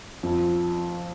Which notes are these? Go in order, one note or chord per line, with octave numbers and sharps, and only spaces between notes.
F2